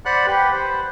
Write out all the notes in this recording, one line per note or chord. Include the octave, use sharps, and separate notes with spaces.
C5 D5 F#5 B5 F#6
G4 B4
B4 C5